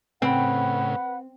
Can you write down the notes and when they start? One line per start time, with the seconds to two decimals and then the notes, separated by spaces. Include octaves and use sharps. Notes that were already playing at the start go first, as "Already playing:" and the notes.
0.22 A2 C#3 C4 B4 F#5